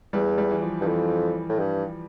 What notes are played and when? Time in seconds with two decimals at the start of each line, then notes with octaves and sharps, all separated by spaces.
0.13 E2 G3
0.38 G3
0.51 E3
0.62 F3
0.81 G2
0.86 F2 E3
1.49 A2
1.59 G2